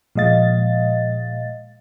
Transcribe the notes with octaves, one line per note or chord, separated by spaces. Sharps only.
A#2 F3 G#3 D#5 F5 A6